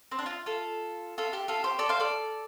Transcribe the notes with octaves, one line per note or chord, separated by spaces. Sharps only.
C4
D4
F4
F4 A4
F4 A4
G4
F4 A4
G4 C5
A4 D5
C5 F5
A4 D5